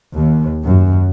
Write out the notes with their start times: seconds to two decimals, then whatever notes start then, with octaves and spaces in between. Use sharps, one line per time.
0.13 D#2
0.63 F#2